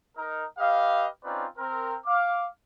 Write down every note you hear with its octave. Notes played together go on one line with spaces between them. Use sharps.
D#4 A#4
G4 B4 D#5 F5
C4 C#4 D#4 F4 B4 D5
C4 A#4
F5 D6